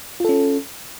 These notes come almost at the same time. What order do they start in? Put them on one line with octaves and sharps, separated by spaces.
F4 A4 C#4